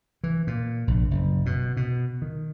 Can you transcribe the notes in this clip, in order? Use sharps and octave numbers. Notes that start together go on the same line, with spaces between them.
E3
A#2
A#1
F#1
B2
B2
D#3